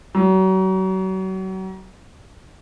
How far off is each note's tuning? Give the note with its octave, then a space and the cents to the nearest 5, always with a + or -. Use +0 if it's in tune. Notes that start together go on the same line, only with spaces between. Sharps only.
F#3 +35